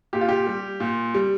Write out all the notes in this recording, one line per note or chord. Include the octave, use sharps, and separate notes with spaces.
A#2 G4
F4
G4
G3
A#2
G3